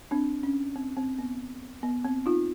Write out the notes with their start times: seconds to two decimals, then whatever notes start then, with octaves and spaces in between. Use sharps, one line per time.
0.11 C4 D4
0.43 C#4
0.76 C4
0.97 C4
1.18 B3
1.83 B3
2.05 C4
2.26 D#4 F4